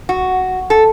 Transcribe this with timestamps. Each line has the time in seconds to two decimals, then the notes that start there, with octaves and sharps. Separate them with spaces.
0.09 F#4
0.70 A4